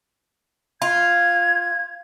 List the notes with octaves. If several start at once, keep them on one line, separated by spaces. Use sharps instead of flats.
F4 G#6